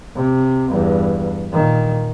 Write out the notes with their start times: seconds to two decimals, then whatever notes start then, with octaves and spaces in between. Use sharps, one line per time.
0.16 C3
0.69 E2 G2
1.53 A#2 D#3